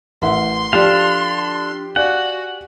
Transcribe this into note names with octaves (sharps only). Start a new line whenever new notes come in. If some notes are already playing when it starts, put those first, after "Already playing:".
A1 A#4 E5 F#5 C6
F3 D4 G4 A4 D5 F5
F#4 D5 F5 F#5 G#5